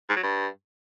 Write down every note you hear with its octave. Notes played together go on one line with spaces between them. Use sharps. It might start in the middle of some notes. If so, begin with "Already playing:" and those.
G#2
F#3
G2